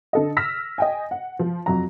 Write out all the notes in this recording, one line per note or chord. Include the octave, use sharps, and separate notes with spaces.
D3 A4 D#5
E6 F6 A#6 B6
D#5 G5 G#5
F#5
F3
F2 F#3 A#5